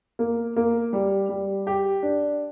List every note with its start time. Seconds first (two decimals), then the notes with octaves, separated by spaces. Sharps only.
0.19 A#3
0.56 A#3
0.93 G3
1.29 G3
1.67 G4
2.03 D4